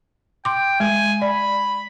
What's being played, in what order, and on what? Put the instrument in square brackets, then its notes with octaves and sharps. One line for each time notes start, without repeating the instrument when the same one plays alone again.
[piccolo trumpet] G5 [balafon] C6 D6
[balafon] G#3 [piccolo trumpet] G#5
[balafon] D5 [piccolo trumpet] B5